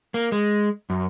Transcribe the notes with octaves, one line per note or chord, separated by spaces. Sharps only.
A#3
G#3
F#2